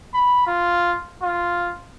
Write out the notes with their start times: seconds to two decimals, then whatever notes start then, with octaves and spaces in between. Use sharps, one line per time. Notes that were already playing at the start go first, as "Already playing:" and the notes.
0.14 B5
0.47 F4
1.23 F4